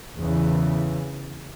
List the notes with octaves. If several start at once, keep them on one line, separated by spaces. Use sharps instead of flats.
E2 C#3 E3